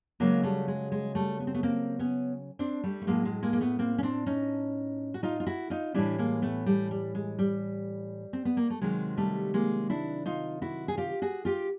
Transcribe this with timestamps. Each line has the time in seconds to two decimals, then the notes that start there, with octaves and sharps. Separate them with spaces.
0.20 C#3 F#3 G#3 A#3
0.43 G3 A3
0.68 G#3
0.92 G#3
1.15 G3 A3
1.40 B3
1.47 C4
1.54 A3 B3
1.63 A#3 C4
1.99 B3 C#4
2.59 C4 D4
2.84 G3 A3
3.02 A3
3.07 A2 F#3 G#3 A#3
3.25 G#3
3.43 G#3 A#3
3.53 A#3
3.61 A3 B3
3.79 A#3 C4
3.98 C#4
4.03 C4 D4
4.26 C#4 D#4
5.14 F#4
5.23 D#4 F4
5.40 F4
5.46 E4 F#4
5.70 D#4 F4
5.94 A2 E3 G3 D4 E4
6.18 G#3 A#3
6.42 A3 B3
6.66 G3 A3
6.91 G3
7.15 G#3
7.39 G3
8.33 C4
8.45 B3
8.57 A#3
8.70 A3
8.81 C3 D#3 F#3 G#3
9.17 G3 A3
9.54 G#3 A#3
9.90 D4 E4
10.26 D#4 F4
10.62 E4 F#4
10.88 G#4
10.98 F4 G4
11.22 F#4 G#4
11.45 F4 G4